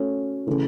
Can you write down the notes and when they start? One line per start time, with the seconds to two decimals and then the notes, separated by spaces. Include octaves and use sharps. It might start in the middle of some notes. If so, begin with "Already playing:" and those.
Already playing: A3 C#4 F#4 C#5
0.47 C#3 E3 A3